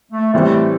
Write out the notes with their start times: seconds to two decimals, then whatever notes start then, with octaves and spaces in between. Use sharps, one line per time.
0.12 A3
0.33 A2 E3 G3 A3 C4